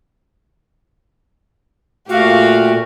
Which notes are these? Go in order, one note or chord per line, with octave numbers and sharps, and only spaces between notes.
A#2 A3 F#4 G4 F5